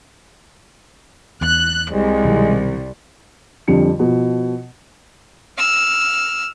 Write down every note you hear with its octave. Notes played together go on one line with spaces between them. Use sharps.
E2 F#6
C2 G#3
B2 D#3 F#3
F2 D3 G3 C#7
B2 F3
E6 F6